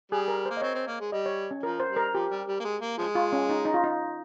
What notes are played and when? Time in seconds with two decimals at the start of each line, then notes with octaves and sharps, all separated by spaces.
0.12 G3 G#4
0.28 A#4
0.45 A#3 C5
0.57 D#5
0.62 C4 C#5
0.75 C4
0.88 A#3
1.00 G#3
1.12 G3 D#5
1.26 C#5
1.51 C#4
1.63 F3 A#4
1.80 C5
1.89 G3
1.97 A#4
2.14 F3 G4
2.31 G3
2.48 G3
2.60 A#3
2.64 G#3
2.82 A#3
2.98 F3 G#3
3.15 F4
3.33 C#4
3.49 D#4
3.65 D#4
3.74 F4
3.84 D#4